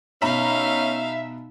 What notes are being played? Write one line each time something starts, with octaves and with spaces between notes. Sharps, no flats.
B2 C#4 D#4 E5 F5 A#5 B5